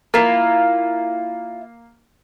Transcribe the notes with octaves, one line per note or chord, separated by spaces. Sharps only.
A#3 E4 F4